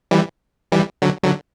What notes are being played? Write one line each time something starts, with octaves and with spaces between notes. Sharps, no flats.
E3 G3
E3 G3
D3 F#3
D3 F#3